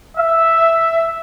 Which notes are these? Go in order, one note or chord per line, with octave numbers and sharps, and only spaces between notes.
E5